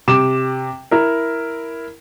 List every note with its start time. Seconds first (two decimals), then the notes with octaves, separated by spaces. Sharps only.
0.08 C3 D6 E7
0.91 E4 A#4